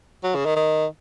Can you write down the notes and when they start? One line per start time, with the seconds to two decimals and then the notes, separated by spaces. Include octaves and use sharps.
0.24 F#3
0.35 C#3
0.45 D#3
0.56 D#3